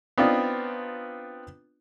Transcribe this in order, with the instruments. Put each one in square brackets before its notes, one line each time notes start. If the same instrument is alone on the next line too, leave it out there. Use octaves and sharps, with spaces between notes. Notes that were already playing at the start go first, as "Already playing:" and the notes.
[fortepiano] B3 C4 D4 D#4 F4